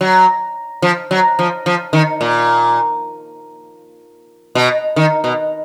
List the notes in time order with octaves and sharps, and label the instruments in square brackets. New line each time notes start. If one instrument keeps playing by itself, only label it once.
[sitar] F#3
F3
F#3
F3
F3
D#3
A#2
B2
D#3
B2